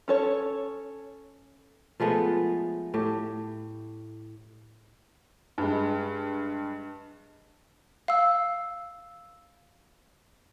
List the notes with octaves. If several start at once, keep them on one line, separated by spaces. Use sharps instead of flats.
C#4 A4 C#5
F3 G#3 A3 B3
A2 G4
G2 G#3
F5 E6